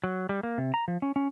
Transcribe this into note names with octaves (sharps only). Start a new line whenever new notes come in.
F#3
G3
A#3
C3
A#5
F3
C#4
C#4